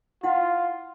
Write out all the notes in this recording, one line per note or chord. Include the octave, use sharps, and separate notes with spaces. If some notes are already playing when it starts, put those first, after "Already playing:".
E4 F4 F#5